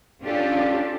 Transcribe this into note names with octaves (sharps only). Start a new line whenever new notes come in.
C#4 D4 F4 G4 A4